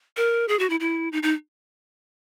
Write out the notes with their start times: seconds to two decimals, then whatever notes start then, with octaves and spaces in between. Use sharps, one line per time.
0.17 A#4
0.48 G#4
0.59 F#4
0.70 E4
0.80 E4
1.12 D#4
1.23 D#4